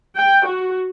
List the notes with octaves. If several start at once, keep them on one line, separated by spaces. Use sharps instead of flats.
G5
F#4